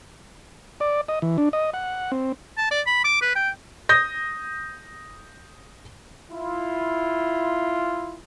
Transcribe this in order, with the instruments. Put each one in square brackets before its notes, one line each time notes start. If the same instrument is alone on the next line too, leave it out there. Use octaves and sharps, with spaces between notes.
[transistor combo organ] D5
D#5
E3
D4
D#5
F#5
C4
[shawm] A5
D5
B5
D6
B4
G5
[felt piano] D#6 G6 A#6
[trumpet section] E4 F4